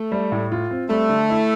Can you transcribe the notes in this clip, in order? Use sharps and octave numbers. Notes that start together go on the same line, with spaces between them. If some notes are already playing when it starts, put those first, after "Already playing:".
Already playing: A3
G3
A2
F4
C4
G3 A3
D3
E4